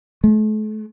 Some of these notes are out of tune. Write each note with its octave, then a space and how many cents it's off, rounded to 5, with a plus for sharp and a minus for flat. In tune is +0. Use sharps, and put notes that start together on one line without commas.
A3 -40